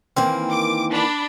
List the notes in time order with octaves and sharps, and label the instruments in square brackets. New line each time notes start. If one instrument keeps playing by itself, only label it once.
[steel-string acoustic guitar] D#3 E3 A#3 [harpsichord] C4
[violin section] D6
D4 B5